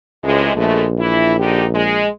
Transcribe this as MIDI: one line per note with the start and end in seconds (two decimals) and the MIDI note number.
0.24 0.49 37
0.24 0.55 45
0.24 0.55 48
0.24 0.55 56
0.56 2.10 34
0.56 0.86 47
0.56 0.86 56
0.56 0.86 57
0.99 1.34 52
0.99 1.34 64
1.40 1.65 50
1.40 1.65 63
1.40 1.65 67
1.75 2.07 56